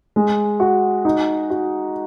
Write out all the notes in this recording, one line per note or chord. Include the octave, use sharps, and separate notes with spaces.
G#3
F#4
D#4
F#4